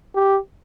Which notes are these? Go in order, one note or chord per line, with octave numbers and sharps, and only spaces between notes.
G4